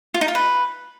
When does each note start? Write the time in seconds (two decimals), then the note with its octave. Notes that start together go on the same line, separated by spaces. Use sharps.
0.14 F4
0.21 D#4
0.28 F4
0.35 B4